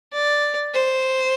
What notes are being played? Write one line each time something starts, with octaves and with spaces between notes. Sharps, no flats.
D5
C5